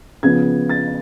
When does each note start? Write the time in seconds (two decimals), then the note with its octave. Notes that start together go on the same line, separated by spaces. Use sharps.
0.23 C#3 F3 B3 G#6
0.70 A6